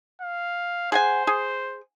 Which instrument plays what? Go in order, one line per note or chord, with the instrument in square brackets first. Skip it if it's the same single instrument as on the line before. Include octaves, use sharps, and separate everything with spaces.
[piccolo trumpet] F5
[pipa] G#4 F#5 G#5 [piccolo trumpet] C5
[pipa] G#4